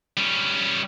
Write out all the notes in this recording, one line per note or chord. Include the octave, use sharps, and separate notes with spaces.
G3 C#4